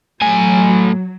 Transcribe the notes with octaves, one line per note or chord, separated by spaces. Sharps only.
A2 F#3 G#5